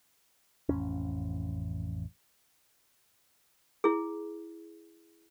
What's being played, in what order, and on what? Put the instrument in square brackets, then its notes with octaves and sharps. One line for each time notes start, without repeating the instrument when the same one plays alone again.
[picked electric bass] A1 F2 G#2 C#4
[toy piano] E4 G#4